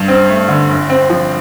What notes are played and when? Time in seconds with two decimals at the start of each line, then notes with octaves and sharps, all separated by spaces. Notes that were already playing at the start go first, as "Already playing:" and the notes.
Already playing: G2
0.08 C4
0.29 A3
0.48 D3
0.69 G1
0.90 C4
1.10 F3